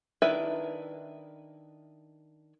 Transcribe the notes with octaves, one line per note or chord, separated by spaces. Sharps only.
D#3 D4 E4 B4 E5